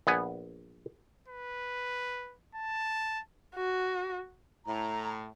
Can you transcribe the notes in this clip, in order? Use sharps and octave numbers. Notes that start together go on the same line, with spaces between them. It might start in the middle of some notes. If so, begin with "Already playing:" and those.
A#1 B3 G#5
B4
A5
F#4
A2 A#5